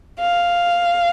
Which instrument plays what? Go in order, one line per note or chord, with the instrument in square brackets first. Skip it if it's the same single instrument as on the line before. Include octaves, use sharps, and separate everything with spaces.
[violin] F5